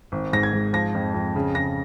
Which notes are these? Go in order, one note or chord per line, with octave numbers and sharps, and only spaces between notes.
G#1
G#2 A#6
G#6
G#2
F3 A#6
F2
F2
C#3
C#3 A#6